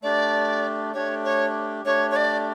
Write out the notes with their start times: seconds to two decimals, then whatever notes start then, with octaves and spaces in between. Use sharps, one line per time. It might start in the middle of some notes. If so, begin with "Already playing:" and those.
0.03 A3 D4 G4 D5
0.94 A3 D4 G4 C#5
1.25 C#5
1.85 A3 D4 G4 C#5
2.11 C#5
2.16 D5